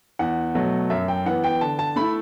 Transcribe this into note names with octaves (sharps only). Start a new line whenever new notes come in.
E2 F#5
B2 F#3 A3
F#2 E5
G5
E3 B3 F#5
G5
D3 A5
A5
A3 E4 B5